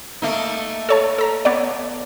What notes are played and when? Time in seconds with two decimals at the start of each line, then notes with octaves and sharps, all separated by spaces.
0.22 A3 A#3 D#4
0.89 A4 C#5 A5
1.18 A4 A#5
1.45 B3 C#5 D5